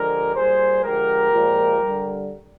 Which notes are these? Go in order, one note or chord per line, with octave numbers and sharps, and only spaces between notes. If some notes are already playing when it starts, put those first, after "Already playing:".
Already playing: D3 F3 G#3 G4 A#4
A#2 G3 G#4 C5
D3 F3 G#3 G4 A#4
A#2 F3 G#3
D3 G3